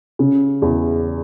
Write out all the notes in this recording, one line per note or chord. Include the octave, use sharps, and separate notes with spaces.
C#3
E2